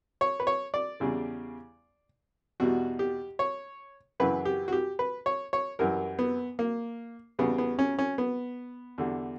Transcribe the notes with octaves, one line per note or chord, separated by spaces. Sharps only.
C#5
B4
C#5
D5
E2 C#3 G3
E2 B2 G3 F#4
G4
C#5
F#2 C#3 E3 B4
G4
F#4
G4
B4
C#5
C#5
F#2 E3 G3 A#4
B3
A#3
E2 C#3 G3 B3
B3
C#4
C#4
B3
E2 D3 G3